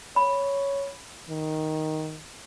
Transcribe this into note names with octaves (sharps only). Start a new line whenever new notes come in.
C#5 B5
D#3